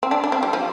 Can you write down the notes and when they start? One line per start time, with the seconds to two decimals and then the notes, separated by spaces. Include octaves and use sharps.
0.03 C4
0.11 D4
0.24 D4
0.32 C4
0.43 G3
0.53 F3